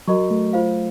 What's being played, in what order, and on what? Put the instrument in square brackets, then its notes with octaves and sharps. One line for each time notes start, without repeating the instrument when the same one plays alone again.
[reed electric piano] F#3 [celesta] F#4 A#4 D#5 A#5 C#6
[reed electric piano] A3
[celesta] F4 C5 F5